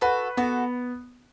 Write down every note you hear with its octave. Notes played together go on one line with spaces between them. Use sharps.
F#4 A4 B4
B3 F#4 A4